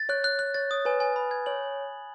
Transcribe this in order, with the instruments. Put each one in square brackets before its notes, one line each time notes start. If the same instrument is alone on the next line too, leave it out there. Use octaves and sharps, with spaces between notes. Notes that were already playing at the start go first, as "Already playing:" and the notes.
Already playing: [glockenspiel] A6
[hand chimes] C#5 [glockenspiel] F#6
[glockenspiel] F#6
F#6
[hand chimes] C#5 [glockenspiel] A6
[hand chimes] C#5 [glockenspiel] D#6
[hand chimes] B4 [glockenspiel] G#5
[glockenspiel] G#5
B5
G#6
[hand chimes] C#5 [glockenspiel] F#7